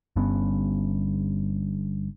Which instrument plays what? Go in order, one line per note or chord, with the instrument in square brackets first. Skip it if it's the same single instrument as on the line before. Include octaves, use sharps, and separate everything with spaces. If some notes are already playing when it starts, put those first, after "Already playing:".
[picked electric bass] G1 G2 B3 C#4